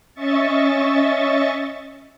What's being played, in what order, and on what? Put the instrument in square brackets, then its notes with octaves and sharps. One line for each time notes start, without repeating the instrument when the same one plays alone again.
[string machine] C#4 D#5 E5 C#6 A6